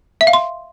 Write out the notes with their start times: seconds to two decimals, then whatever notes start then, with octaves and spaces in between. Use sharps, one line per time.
0.21 E5
0.27 F5
0.33 C6